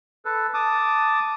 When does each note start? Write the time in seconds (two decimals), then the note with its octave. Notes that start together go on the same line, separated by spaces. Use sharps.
0.25 A4 B4
0.54 A5 D6 D#6